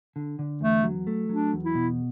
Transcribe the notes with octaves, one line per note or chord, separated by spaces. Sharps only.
D3
D3
E2 A3
F#3
A3
F#3 D4
E2
E4
B2